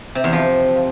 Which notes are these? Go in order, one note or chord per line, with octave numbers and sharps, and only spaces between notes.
C3
E2
F3